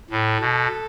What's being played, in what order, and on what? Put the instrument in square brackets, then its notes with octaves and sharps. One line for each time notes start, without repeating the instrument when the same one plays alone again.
[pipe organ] A2 [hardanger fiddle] A4
[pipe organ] B2